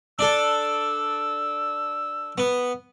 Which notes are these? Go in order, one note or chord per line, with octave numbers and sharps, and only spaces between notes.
D4 A4 E6
B3